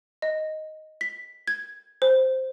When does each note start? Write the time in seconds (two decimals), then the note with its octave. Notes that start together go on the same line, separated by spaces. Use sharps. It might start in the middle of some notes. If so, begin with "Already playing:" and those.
0.22 D#5
1.01 B6
1.48 G#6
2.02 C5